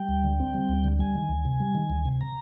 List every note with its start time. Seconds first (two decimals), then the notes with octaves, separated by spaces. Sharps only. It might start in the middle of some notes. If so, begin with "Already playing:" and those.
Already playing: G3 G5
0.09 D2
0.24 D3
0.40 C4
0.54 G3
0.69 D2
0.84 D3
0.99 G3 G#5
1.15 D#3
1.29 D2
1.45 C3
1.60 G3
1.75 D#3
1.90 D2
2.05 C3
2.21 A#5